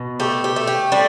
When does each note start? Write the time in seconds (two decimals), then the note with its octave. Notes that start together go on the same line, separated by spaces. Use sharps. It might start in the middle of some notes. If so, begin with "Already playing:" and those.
Already playing: B2
0.20 A3 G4
0.44 G4
0.56 A3
0.67 G4
0.92 G3 D4